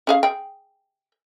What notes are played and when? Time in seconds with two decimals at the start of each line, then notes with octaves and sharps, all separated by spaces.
0.07 C#4 G#4 F5
0.23 G#4 G5